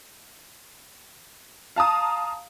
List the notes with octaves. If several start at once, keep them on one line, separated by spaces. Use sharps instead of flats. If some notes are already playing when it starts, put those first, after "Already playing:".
F5 A5 A#5 D#6